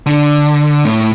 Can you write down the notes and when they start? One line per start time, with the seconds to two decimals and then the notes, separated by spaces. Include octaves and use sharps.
0.06 D3
0.85 A2